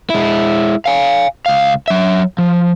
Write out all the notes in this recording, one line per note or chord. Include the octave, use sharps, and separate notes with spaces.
G#3 E4
F5 G#5
C#2 F5
F#3 E5
F3